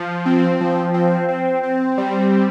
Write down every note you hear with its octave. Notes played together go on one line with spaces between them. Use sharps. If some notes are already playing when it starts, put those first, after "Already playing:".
Already playing: F3
C4
F3
C4
C4
C4
G3